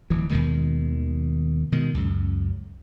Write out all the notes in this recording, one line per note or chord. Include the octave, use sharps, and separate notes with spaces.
D1 E3
D#2 B2 D#3 G#3
B2 D#3 G#3
C#2 F#2